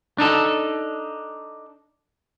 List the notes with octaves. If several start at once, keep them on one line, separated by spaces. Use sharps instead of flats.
D4 D#4 A4